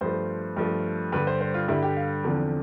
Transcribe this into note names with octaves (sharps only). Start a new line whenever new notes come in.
G2 F3 A3 C5
G2 F3 A3
G2 D3 G3 B4
C5
C5
F4
G2 D3 G3 E4
G4
F5
E2 D3 F3 C4